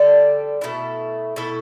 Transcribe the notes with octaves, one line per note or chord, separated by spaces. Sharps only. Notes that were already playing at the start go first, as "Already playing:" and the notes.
Already playing: D3 G3 D4 A4
B2 A3 E4 A4
B2 A3 E4 A4